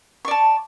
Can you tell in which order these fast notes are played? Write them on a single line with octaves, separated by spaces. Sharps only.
C#6 D5 A5